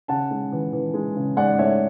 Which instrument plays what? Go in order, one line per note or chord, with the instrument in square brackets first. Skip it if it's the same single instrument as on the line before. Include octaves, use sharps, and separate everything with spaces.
[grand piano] C#3 F#5 A5
G#3
E3
E3
G#3
C#3
G#2 D5 F#5
A3 C#5 E5